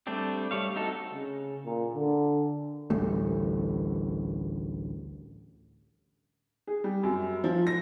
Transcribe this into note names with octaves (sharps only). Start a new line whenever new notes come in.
G3 A3 C4 D4 G4
G3 A3 C#5 F5
C4 D#4 F#4 A4
C#3
A#2
D3
A1 D2 G3 A3
G#4
G3
F#2
F3
A#6